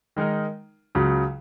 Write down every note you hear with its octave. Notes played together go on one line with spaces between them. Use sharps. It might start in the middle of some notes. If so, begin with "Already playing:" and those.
D#3 G#3 D#4 A#4
C#2 C#3 F#3